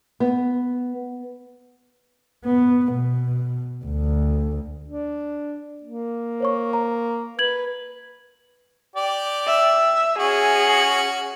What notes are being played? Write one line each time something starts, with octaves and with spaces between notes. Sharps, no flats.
B3
B3
B2
D2
D4
A#3
C5 C#5 C#6
A#5
B4 G#6 F#7
G4 D5
E5
C#4 F#4 G#4